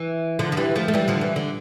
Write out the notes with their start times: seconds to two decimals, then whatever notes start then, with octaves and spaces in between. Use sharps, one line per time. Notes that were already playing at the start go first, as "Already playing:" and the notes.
Already playing: E3
0.39 D3 F3
0.52 F3
0.57 E3 G3
0.76 F3 A3
0.88 A3
0.94 E3 G3
1.08 D3 F3
1.21 E3
1.36 D3